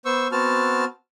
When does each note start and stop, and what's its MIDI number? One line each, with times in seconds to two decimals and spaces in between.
0.05 0.28 59
0.05 0.28 72
0.05 0.28 85
0.05 0.28 88
0.32 0.85 59
0.32 0.85 60
0.32 0.85 66
0.32 0.85 81
0.32 0.85 89